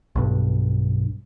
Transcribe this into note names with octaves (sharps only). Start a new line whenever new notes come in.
B1 G2